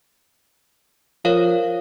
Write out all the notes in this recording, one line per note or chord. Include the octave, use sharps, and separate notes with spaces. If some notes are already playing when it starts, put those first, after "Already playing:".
F3 A#4 C#5 F5